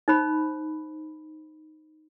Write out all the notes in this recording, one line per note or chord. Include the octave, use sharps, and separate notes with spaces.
D#4 C5 B5